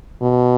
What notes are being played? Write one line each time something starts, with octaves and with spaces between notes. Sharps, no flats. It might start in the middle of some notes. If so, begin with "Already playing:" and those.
B2